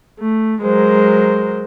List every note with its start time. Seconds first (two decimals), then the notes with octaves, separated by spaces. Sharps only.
0.20 A3
0.63 F#3 G#3 A#4 C5